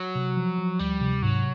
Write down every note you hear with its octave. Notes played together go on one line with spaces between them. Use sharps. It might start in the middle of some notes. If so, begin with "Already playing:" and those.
Already playing: F#3
C3
F3
F3
D2 G3
C3
G#2 F#3